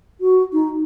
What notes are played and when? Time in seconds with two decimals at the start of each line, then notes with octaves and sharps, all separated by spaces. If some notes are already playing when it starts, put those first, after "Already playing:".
0.21 F#4
0.53 D#4